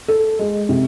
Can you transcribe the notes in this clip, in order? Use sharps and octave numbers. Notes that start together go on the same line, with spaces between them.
A4
G#3
C3